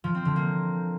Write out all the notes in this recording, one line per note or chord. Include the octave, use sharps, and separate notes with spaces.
F3
C4
D3
A#3